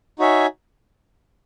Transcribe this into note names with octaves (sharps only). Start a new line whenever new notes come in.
D#4 F#4 C#5 E5 G#5